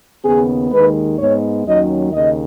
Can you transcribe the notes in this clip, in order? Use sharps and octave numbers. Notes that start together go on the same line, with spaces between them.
D#2 C#3 B3 G#4
D#2 D#3 G#3 B4
G#2 G#3 B3 C#5
D#2 D#3 F#3 C#4 D#5
D#2 C#3 D#5